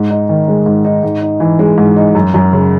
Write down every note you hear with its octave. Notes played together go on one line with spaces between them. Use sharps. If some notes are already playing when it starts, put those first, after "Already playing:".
Already playing: G#2
D#4
D#3
G#3
G#2
D#4
G#2
D#4
E3
G#3
G#2
D#4
F#2
F#2
C#3